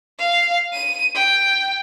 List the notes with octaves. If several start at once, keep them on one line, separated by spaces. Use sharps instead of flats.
F5
D#7
G5